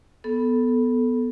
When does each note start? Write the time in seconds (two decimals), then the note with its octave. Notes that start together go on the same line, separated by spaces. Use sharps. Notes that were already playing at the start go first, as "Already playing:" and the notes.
0.24 B3 A4